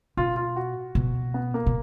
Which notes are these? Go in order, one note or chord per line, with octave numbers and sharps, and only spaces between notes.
B2 F4
F4
F#4
B2
B3
A#3
B2